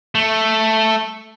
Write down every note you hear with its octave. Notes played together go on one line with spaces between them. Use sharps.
A3